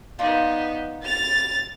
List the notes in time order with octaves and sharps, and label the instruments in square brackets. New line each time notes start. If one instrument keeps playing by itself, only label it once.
[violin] B3 D#4 [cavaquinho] F4 D5
[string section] A6 [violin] F7